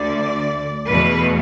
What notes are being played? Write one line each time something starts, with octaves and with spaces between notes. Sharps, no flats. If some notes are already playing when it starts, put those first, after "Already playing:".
Already playing: D2 D3 A3 D5
E2 B2 A3 B4